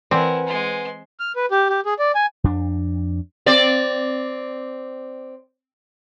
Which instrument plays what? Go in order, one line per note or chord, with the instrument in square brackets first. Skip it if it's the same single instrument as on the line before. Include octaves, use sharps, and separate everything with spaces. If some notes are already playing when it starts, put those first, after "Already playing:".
[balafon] E3 D6 [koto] C4 [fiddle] E4 A#4 [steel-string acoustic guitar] B4 F#5 G#5
[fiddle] G#3 C6
[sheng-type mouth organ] F6
B4
G4
G4
G#4
D5
G#5
[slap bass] F2 D4
[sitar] C4 D5